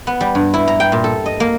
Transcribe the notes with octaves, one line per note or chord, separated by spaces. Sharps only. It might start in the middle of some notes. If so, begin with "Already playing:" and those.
B3
G3
G2
E4
A#5
G5
A#2
A4
D#5
A#3